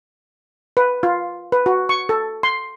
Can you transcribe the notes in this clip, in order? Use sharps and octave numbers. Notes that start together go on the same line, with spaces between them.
B4
F4
B4
F#4
C#6
A4
C6